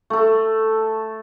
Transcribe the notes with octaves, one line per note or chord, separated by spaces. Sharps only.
A3 A4